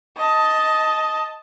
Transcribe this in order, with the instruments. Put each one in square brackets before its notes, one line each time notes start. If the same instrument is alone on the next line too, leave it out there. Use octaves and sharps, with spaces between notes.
[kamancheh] D#5 A5